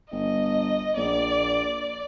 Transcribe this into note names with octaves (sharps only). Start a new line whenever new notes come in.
G1 D#5
A#1 D5